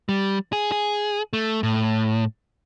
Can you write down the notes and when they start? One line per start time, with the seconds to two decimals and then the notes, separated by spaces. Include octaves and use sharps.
0.09 G3
0.53 G#4
0.72 G#4
1.33 A3
1.63 A2